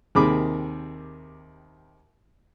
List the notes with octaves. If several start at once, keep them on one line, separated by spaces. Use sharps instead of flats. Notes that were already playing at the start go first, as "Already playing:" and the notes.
D#2 C3 D#3 G#4 B5 D6